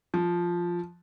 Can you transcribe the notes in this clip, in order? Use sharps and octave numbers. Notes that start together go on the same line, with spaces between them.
F3